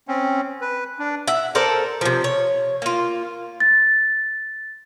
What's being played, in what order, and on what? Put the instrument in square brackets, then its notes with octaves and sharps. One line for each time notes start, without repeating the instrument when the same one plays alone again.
[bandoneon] C4 C#4
B4
D4
[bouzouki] E5 F#5
A4 A#4 C5 D5
C3 F3
C#5
A#3 F4
[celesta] A6